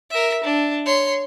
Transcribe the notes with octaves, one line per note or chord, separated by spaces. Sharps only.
A#4 E5
D4
C#5 C6